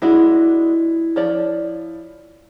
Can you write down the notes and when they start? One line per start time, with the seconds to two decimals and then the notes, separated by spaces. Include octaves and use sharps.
0.02 G#3 D4 E4 F#4
1.16 F3 C#5 D5